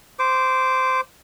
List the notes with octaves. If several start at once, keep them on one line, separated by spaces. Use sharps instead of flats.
C5 D6